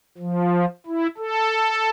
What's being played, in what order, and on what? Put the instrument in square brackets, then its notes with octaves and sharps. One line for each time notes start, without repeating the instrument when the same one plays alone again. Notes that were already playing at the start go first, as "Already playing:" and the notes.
[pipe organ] F3
E4
A4